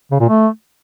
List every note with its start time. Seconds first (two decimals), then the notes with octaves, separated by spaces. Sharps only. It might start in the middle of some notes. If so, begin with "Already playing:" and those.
0.11 C#3
0.20 A#2
0.29 A3